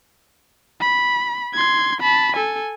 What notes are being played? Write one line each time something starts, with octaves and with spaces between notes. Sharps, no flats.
B5
C6 G#6
A5 B5
A4 G#5